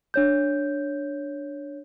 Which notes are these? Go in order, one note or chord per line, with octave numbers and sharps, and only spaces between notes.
D4 C#5 G6